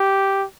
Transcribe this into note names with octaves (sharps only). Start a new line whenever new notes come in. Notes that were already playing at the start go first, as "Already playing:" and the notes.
Already playing: G4